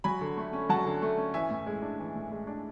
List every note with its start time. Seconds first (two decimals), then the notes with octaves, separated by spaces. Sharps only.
0.04 F#3 G#5 B5
0.21 D3
0.37 A3
0.53 C#4
0.69 F#3 F#5 A5
0.86 D3
1.02 A3
1.18 C#4
1.34 E3 E5 G#5
1.50 A2
1.67 G#3
1.82 D4
1.99 E3
2.15 A2
2.32 G#3
2.47 D4